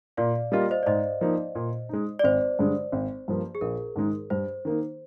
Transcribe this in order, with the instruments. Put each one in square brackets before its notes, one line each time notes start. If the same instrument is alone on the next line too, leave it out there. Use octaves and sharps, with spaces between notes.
[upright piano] A#2 [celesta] D5 F5
[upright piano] G3 A#3 F4 [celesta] D#5
[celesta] F5
C5 D#5
D5
[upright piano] G#2 [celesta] C5 D#5
[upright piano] F3 A#3 D#4
A#2
G#3 D#4
[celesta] D5
[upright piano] G#1 [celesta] C5
[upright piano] G2 D3 G#3
G#1
G2 F3 A#3
[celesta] G#4
[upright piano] A#1 [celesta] A#4
[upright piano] G#2 D#3 G#3 D#4
[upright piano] G2 [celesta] C5
[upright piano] D#3 A#3 D#4